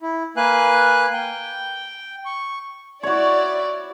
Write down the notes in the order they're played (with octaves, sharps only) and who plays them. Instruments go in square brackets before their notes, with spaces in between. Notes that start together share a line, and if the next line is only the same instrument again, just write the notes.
[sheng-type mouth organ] E4
A#3 B4 F5 G#5 F#6
G5
C#6
[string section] E4 D5 [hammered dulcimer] F#4 C#5